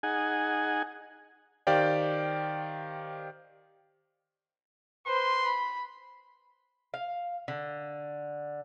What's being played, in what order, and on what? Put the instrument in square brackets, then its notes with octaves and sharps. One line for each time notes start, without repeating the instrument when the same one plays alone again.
[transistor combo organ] D#4 G#4 F#5 G#5
[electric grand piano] D#3 G4 C5 D5 F5 G5
[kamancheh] B4 C5 [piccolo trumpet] C6
[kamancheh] B5
[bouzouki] F5
D3